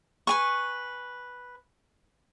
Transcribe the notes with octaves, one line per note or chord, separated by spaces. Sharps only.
B4 G#5 C#6